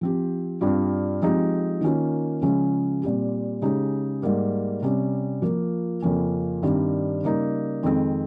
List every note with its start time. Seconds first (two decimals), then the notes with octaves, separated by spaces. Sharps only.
0.01 F3 C4 G4
0.61 G2 G3 C4 F4
1.22 F3 G#3 C4 D#4 G4
1.81 D#3 A#3 C#4 F4
2.41 C#3 F3 G#3 C#4
3.02 A#2 G3 C4 G4
3.62 C#3 G#3 D#4 G4
4.22 G#2 G3 A#3
4.82 C3 G3 C#4
5.42 F3 A#3 F4
6.02 F2 C#3 F3 A#3 C#4
6.62 G2 D#3 G3 C4
7.23 C#3 G3 A#3 D#4
7.83 F2 D#3 G#3 C4